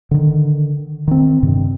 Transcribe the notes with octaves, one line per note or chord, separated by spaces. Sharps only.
D3 D#3
D#3 C4
G2 C3 D#3